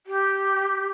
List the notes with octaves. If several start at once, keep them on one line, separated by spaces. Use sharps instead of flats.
G4